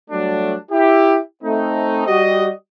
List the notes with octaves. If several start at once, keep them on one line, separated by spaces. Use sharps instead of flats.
F#3 G3 A3 D4
E4 G4
A3 C4 D#4
G3 F#4 G4 D#5